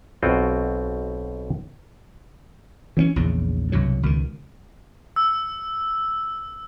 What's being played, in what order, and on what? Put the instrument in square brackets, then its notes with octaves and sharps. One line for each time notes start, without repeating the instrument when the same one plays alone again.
[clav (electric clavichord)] B1 B2 C4 F4 F#4 G5
[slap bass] E3 C4 C#4
A#1 E2 C#3
C2 G2 B2 F#3
C#2 B2 D#3
[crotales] E6